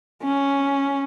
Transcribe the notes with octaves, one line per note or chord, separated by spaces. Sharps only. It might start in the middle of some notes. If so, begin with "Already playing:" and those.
C#4